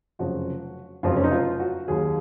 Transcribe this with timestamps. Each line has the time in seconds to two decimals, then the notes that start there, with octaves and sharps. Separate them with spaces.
0.19 F1 F2 C#3 F#3 F#4
1.03 F1 F2 C#3 F#3 F4
1.16 C#4
1.24 D#4
1.31 F4
1.60 F#4
1.88 D#2 D#3 F#3 G#4